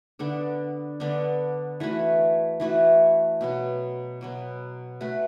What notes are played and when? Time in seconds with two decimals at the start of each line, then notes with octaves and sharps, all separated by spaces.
0.19 D3 B3 D4 A4
1.00 D3 B3 D4 A4
1.80 E3 A3 F#4 B4
2.60 E3 A3 F#4 B4
3.41 B2 F#3 B3
4.21 B2 F#3 B3
5.01 A3 F#4 B4